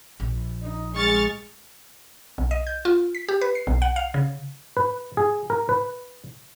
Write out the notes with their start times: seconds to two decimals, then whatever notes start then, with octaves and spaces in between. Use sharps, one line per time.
0.20 A#1
0.61 D#4
0.95 G#3 C#6 F6 A6
2.38 B1
2.51 D#5
2.67 G6
2.85 F4
3.15 B6
3.28 G4
3.41 B4
3.55 C7
3.67 B1
3.82 F#5
3.96 F5
4.14 C#3
4.77 B4
5.17 G#4
5.50 A#4
5.69 B4